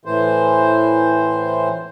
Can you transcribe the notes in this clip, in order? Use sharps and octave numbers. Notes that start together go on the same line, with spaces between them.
A2 E3 C5